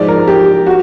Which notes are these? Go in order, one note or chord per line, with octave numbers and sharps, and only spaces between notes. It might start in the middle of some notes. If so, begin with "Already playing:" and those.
Already playing: G#2 F3 G#3 D5
A#4
G4
F#4